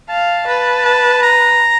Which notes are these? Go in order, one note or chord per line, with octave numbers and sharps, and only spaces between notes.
F5 A5
B4
A5
A#5